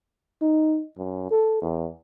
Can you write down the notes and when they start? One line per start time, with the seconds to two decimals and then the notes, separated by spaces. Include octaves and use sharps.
0.42 D#4
0.98 F#2
1.31 A4
1.62 E2